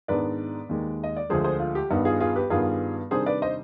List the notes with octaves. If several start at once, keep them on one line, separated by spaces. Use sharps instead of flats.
G#2 D#3 B3 D4 B4 D5
D#2 D#3 G#3
D#5
D5
D2 D3 F3 G#3 G#4 C5
G#4 C5
F4
G4
G2 D#3 G3 B3 D#4
F4 G#4
F4 G#4
G4 B4
G2 D#3 G3 B3 F4 G#4
C3 D#3 G3 D4 G#4 C5
B4 D5
C5 D#5